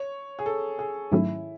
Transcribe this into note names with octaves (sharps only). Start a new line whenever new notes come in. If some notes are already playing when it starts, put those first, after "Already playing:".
Already playing: C#5
G#4
A4
G#4
G#2 D#3 F#3 A3 C#4 E4